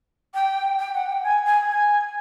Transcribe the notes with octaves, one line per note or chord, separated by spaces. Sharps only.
G5
G5
F#5
G5
G#5
G#5
G#5